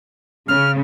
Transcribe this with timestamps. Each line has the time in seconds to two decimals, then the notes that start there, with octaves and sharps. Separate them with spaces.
0.48 C#3 F6